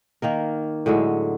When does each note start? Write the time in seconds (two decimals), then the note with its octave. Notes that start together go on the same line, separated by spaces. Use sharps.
0.22 D#3 A#3 A#4
0.86 A2 D3 F#3 G#3